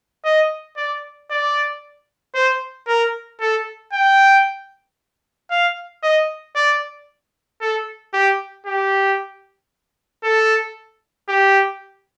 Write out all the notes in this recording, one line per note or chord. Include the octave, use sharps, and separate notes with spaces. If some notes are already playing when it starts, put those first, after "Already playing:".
D#5
D5
D5
C5
A#4
A4
G5
F5
D#5
D5
A4
G4
G4
A4
G4